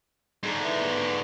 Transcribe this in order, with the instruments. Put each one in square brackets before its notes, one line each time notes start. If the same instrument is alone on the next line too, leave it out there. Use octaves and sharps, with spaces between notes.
[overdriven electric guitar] G#2 D3 [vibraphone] G#4 A#5
[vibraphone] E4 B4 E5
B3 G#4 B4